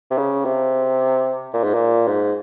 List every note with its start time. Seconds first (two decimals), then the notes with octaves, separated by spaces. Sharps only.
0.11 C3
0.18 C#3
0.45 C3
1.54 A#2
1.64 G#2
1.74 A#2
2.08 G#2